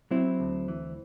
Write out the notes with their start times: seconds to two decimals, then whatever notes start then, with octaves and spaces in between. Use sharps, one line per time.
0.11 F#3 C4 E4
0.40 D2
0.68 E3